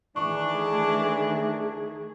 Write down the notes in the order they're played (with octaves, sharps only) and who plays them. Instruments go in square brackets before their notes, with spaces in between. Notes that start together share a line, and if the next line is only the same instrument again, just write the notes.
[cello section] D#3 A3 G#4 [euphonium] E3 [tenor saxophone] D4 [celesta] C#6